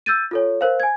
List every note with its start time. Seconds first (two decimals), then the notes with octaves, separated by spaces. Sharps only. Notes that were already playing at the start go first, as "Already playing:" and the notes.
0.06 E6 G6 A6 D#7
0.31 F4 A4 C#5
0.61 A#4 C5 F5
0.80 G#5 G#6